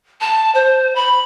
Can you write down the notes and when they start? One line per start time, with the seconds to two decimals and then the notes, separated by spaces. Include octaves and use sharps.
0.21 A5
0.55 C5
0.96 B5